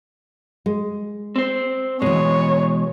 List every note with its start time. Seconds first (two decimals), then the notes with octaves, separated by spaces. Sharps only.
0.66 G#3
1.36 C4 C5
2.02 B2 E3 G#3 C#5